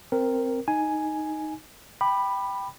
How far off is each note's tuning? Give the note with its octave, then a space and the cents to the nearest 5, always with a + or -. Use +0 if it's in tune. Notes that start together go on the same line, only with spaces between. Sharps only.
C4 +0 A#4 +0
D#4 +0 G#5 +5
G5 +0 B5 +0 D6 +35